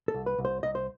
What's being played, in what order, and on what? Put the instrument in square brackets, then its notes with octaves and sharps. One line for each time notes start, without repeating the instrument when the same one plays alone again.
[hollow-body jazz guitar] A4
C2
B4
C2
C5
C2 D#5
C5